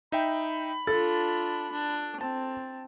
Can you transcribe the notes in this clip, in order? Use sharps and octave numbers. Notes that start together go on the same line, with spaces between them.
D#4 E5 G5 B5
D4 F4 A4 A6
D4
C4 A5